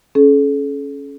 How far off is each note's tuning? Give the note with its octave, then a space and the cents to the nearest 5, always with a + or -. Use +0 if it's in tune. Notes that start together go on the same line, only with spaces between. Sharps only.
C#4 +0 A4 -45